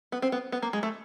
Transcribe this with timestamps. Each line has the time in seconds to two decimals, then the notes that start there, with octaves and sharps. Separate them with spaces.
0.12 B3
0.22 C4
0.32 B3
0.52 B3
0.62 A#3
0.73 G#3
0.83 A3